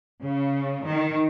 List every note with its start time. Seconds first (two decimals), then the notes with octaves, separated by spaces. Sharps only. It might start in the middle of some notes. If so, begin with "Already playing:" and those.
0.24 C#3
0.88 D#3